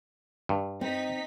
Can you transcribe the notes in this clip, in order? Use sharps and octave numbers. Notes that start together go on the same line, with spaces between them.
G2
C4 D#4 B6